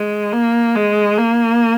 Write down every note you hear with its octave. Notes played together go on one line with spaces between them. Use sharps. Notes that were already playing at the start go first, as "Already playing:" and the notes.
Already playing: G#3
A#3
G#3
A#3